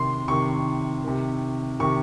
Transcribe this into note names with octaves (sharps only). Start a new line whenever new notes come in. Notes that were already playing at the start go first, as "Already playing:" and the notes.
Already playing: C3 D#3 C6
C3 D#3 C#6
C3 D#3
C3 D#3 C#6